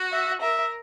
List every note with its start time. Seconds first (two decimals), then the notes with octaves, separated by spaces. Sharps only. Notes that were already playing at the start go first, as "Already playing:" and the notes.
Already playing: F#4
0.12 E5
0.41 A#4 E5